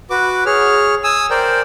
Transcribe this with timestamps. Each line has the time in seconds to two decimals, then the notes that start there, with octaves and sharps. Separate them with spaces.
0.10 F#4 B4 D6
0.46 G#4 C#5 F6
1.04 G#5 D#6 E6
1.30 A#4 C5 D5 G5